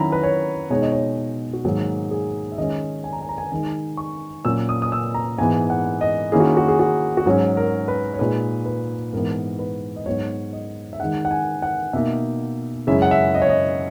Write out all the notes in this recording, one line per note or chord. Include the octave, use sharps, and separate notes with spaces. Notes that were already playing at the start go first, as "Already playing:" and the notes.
Already playing: D#3 F#3 C#4 E4 A#5 B5
B4
C#5
B2 G#3 D#4 C#5
D#5
C#5
F#4
G#2 D#3 F#3 A#3 D#4 G#4
G#4
E5
D#3 G#3 C#4 D#5
G#5
A#5
G#5
A#5
G#5
D#3 G#3 D#4 G#5
C#6
A#2 F#3 C#4 E6
D#6
D#6
E6
A#5
G#2 E3 G#3 B3 G#5
F#5
D#5
D#3 A#3 C#4 E4 G#4
F#4
F#4
G#4
F#4
F#4
G#2 F#3 C#4 G#4
A#4
B4
C#5
A#2 G#3 D#4 B4
B4
G#2 E3 B3 A#4
B4
D#5
G#2 F#3 B3 D#4 C#5
D#5
E5
D#3 G#3 D#4 F#5
F#5
G#5
F#5
B2 A#3 D#4 E5
F#2 C#3 G#3 C#4 E4 E5
F#5
E5
D#5
C#5
D#5